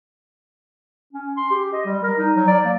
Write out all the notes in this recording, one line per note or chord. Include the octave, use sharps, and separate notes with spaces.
C#4
C6
G4
D#5
G3
A#4
D#4
F#3
D5
A#3